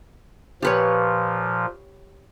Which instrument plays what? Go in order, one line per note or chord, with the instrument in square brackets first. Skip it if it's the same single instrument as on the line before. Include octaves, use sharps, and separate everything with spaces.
[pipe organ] A#2 F3 [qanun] G4 B4 C#5